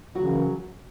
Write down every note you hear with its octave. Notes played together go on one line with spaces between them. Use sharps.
F#2 C#3 E3 F#3 F#4